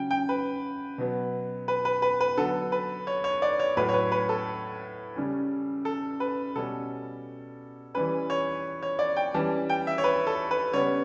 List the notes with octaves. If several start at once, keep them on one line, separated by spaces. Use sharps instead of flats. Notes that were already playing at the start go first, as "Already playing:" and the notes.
Already playing: C#3 F#3 C#4 G5
G5
B4
B2 F#3 B3
B4
B4
B4
B4
D3 F#3 B3 A4
B4
C#5
C#5
D5
C#5
A2 F#3 A3 B4
C#5
B4
B4
A4
C#3 G3 C#4
A4
B4
B2 G3 C#4 A4
E3 G3 C#4 B4
C#5
C#5
D5
G5
E3 G3 C#4 A5
G5
E5
C#5
B4
A4
B4
C#3 G3 B3 C#5